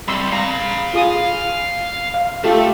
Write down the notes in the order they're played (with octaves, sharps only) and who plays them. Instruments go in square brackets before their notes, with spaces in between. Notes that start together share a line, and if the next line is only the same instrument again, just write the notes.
[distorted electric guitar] G3 C4 [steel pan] B5 C6 E6
[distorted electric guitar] F5 B5 [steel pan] A#5
[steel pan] F4 G#4 D#6
F5
[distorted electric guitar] A3 [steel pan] F4 G4 A4